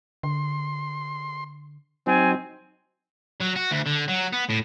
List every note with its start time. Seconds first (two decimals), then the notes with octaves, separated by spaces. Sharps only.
0.23 D3 C6
2.07 F#3 C4 D#4 G#5
3.41 F#3
3.56 F#4
3.72 D2
3.87 D3
4.09 F#3
4.33 B3
4.50 A2